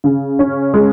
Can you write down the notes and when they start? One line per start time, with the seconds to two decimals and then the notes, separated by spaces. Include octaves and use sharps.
0.04 C#3
0.39 C#4
0.74 G#3